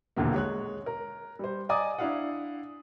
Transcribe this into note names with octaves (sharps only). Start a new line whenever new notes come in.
D#1 B1 E2 D3 A#3
G#3 C#5 F#6
A#4
G3 C5
D5 D#5 G#5 A#5 D6 D#6
D4 E4 F5 F#5